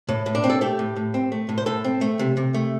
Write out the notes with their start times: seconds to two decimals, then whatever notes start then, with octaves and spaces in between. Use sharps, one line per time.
0.09 A2
0.26 A2
0.35 D4
0.44 C4
0.50 A4
0.61 A3 G4
0.79 A2
0.96 A2
1.14 C4
1.32 A3
1.49 A2
1.58 C5
1.66 A2 A4
1.84 C4
2.01 A3
2.19 C3
2.37 C3
2.54 A3